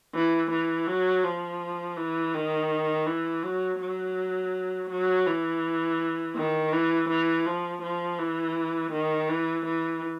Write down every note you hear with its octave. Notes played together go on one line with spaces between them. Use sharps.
E3
E3
F#3
F3
E3
D#3
E3
F#3
F#3
F#3
E3
D#3
E3
E3
F3
F3
E3
D#3
E3
E3